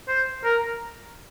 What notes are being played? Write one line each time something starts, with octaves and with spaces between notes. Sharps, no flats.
C5
A#4